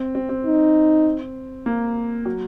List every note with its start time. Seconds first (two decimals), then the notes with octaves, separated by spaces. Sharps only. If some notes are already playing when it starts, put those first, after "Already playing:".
Already playing: C4
0.15 C4
0.29 C4
0.45 D#4
1.66 A#3
2.25 F#3